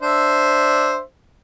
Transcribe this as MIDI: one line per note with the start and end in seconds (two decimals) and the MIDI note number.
0.02 0.99 62
0.02 0.99 72
0.02 0.99 76